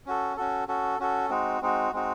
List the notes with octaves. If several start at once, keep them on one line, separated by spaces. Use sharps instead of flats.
C#4 F#4 A4
C#4 F#4 A4
C#4 F#4 A4
C#4 F#4 A4
G#3 C4 D#4 F#4
G#3 C4 D#4 F#4
G#3 C4 D#4 F#4